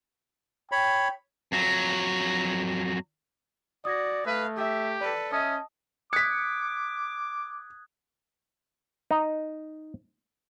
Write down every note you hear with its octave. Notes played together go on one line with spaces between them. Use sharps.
C#5 G5 B5
F2 F#3
F#4 D5 D#6 G#6 A#6
A3 B4 F5
G4 E5
A4 B4 D5
C#4 D#5 E5 A5 D#6
D6 D#6 F#6 G#6 B6 C#7
D#4